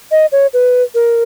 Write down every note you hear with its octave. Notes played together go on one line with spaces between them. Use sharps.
D#5
C#5
B4
A#4